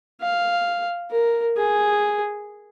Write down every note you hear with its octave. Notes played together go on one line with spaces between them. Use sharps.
F5
A#4
G#4